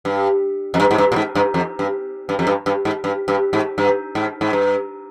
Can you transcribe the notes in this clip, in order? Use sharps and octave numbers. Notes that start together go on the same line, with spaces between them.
G2
F2
G2
G#2
G2
A#2
G#2
G2
F2
G2
G2
F2
G2
G2
G#2
G2
G2
G#2
G2
G#2
G#2
G2